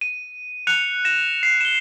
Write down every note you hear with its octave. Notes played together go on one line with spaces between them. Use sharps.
D#7
F#6 C#7 F7
A#6 E7
C7
E7 G7